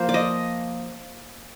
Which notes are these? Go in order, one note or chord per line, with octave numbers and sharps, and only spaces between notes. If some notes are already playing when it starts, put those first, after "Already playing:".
Already playing: F3 A#3 A#4 C5
D5
D#5